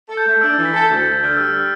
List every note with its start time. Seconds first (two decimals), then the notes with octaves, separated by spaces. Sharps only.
0.09 A4
0.17 G6
0.26 A3
0.41 D4 E6
0.54 E3 A6
0.65 B6
0.73 A4 A6
0.89 D2 G6
1.05 D2
1.14 G6
1.20 D3 F6
1.37 G3 E6
1.49 F6